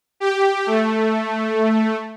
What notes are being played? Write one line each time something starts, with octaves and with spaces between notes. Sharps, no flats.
G4
A3